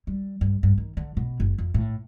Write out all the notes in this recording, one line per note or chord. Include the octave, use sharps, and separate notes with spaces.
G3
G2
G2
D#3
D3
B2
F#1
F2
A2